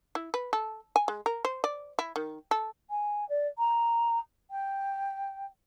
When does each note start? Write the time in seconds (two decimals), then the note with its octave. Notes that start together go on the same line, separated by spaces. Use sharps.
0.15 E4
0.34 B4
0.53 A4
0.96 G#5
1.08 G#3
1.26 A#4
1.45 C5
1.64 D5
1.99 E4
2.16 D#3
2.51 A4
2.90 G#5
3.29 D5
3.58 A#5
4.50 G5